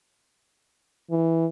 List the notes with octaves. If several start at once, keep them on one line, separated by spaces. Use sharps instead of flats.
E3